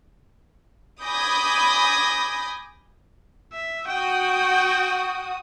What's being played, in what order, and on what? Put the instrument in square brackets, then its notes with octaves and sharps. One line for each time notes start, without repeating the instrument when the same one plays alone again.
[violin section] G#5 B5 D6 D#6 G6 A#6
[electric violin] E5
[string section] F#4 D#6 [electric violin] G5